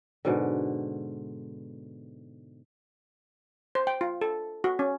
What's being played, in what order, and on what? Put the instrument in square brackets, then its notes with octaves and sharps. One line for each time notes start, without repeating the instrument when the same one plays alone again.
[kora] G#2 B2 D3
[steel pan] C5
G5
F4
A4
F#4
C#4